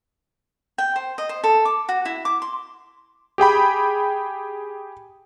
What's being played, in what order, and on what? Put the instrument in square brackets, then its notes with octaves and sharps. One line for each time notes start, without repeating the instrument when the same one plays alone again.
[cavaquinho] G5
C5
D#5
C5
A4
D6
F#4
E4
D6
C6
[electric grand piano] G4 G#4 G5 B5